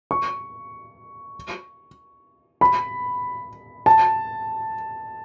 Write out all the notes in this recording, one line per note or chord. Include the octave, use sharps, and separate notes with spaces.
C#6
B5
A5